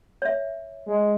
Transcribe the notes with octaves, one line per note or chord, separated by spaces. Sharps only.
C#5 E5
G#3